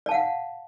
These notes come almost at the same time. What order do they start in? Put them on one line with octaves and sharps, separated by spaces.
D5 A5 F5 F#5